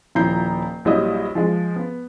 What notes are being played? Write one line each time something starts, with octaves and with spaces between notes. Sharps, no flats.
D#1 F3 E4 A#5 G6 C7
A#1 F#3 G3 E4 D#5 D#6
F3 G#3
B3